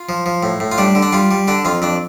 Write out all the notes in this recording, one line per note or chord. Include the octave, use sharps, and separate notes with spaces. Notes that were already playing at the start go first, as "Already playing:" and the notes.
Already playing: F4
F3
F3
A2
A2
F4
G3 D4
D3
D4
G3 F4
G3
D3 D4
F2 F4
F2 D4